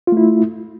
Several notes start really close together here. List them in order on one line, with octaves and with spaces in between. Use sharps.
F4 A3 E4